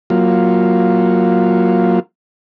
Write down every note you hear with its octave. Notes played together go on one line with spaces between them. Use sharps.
F#3 A#3 F4